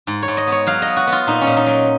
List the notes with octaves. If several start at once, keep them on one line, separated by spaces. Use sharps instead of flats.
G#2
C#5
G#2
D#5
B3 C#5
F#3 F5
D#5
B3
F#4
B3
F4
A#2 D#4
C#4
A#2
D#4
F#3